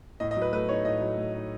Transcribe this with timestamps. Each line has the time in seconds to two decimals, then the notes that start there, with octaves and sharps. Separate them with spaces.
0.20 A2 D#5
0.31 D#5
0.37 F#3
0.42 B4
0.52 A3 B4
0.69 D#4 C#5
0.85 A2 D#5
1.01 F#3
1.18 A3
1.34 D#4